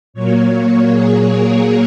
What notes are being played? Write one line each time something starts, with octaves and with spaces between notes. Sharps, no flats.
A#2 F#3 A#3 C#5
G#4
A#4